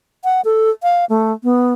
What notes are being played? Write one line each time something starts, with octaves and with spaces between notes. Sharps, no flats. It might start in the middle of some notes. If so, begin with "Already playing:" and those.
F#5
A4
F5
A3
B3